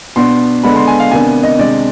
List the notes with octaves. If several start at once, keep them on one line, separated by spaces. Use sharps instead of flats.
B2 B3 D4 C6
D3 G#3 B3 D4 B5
C6
G#5
F5
C3 D#3 B3 D4 G#5
D#5
C3 D#3 G#3 D4 D5